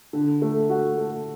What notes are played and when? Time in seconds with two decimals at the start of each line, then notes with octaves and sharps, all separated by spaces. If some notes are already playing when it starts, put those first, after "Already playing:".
0.13 D3
0.42 A3
0.70 F#4
0.98 A3